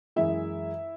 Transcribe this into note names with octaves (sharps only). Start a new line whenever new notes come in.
F#2 E3 G#3 E4 E5